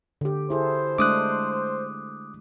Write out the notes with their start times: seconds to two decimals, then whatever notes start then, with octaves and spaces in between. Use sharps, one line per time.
0.21 D3 G4
0.50 E4 G#4 A4 C5
0.98 G#3 A3 D4 D6 D#6 F#6